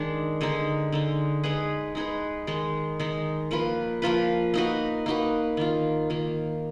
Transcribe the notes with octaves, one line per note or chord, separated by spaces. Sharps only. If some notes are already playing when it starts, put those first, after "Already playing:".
Already playing: D#3 G#3 D4
D3 G#3 D#4
D3 G#3 D#4
G#3 D#4 G#4 B4
G#3 D#4 G#4 B4
D#3 G#3 D#4
D#3 G#3 D#4
F3 A#3 F4 B4
F3 A#3 F4 B4
A#3 D#4 F#4 B4
A#3 D#4 F#4 B4
D#3 A#3 F4
D#3 A#3 F4